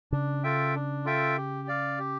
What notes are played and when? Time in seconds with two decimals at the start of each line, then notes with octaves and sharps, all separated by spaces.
0.12 C#3 D4
0.44 F4 A4 E5 G5
0.75 D4
1.05 F4 A4 E5 G5
1.37 G4
1.68 D5 F5
1.99 G4